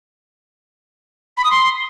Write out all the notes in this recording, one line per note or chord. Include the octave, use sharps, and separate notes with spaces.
B5
D#6
C6